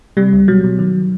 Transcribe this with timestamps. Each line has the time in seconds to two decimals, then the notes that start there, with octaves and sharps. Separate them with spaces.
0.17 C3 G3
0.33 C#2
0.48 B2 F#3
0.64 B2
0.79 D#3